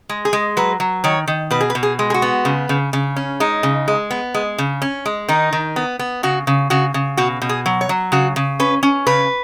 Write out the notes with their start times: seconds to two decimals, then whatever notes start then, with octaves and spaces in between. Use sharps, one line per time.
0.09 G#3
0.25 G#4
0.33 G#3
0.57 F#3 B4
0.80 F#3
1.04 D#3 C#5
1.27 D#3
1.51 B2 B4
1.61 G#4
1.70 B4
1.75 B2
1.83 G#4
1.99 G#3
2.10 G#4
2.14 F#4
2.22 B3
2.45 C#3
2.69 C#3
2.93 C#3
3.16 C#4
3.40 G#3 D#4
3.63 C#3
3.88 G#3
4.10 B3
4.34 G#3
4.58 C#3
4.82 C#4
5.06 G#3
5.28 D#3 D#4
5.53 D#3
5.76 B3
5.99 B3
6.23 C#3 F#4
6.47 C#3
6.70 C#3 F#4
6.94 C#3
7.17 B2 F#4
7.42 B2
7.49 G#4
7.66 F#3
7.81 C#5
7.89 F#3
8.12 C#3 F#4
8.36 C#3
8.60 C#4 B4
8.83 C#4
9.07 C#3 B4